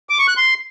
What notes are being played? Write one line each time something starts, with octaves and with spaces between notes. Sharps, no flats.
D6
C#6
F#6
C6